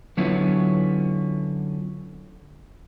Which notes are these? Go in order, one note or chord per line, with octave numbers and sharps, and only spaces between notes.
D3 F#3 B3 C#4 E4 F4